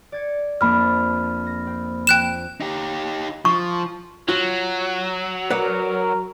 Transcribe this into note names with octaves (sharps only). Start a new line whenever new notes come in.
D5 G#6 C#7
F2 A#3 D4 B5 F6
A#6
C4
F3 G5 F#6 E7
D#4 G4
F3 C#6
F#3 F4 F#4
F#4 A#4 B4 D5 F#5